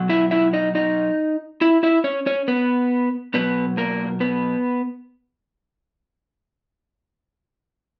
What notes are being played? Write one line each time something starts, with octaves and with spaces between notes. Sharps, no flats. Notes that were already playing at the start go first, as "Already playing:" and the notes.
Already playing: B2 F#3
E4 E5
E4 E5
D#4 D#5
D#4 D#5
E4 E5
E4 E5
C#4 C#5
C#4 C#5
B3 B4
B2 F#3 B3 B4
A#3 A#4
B3 B4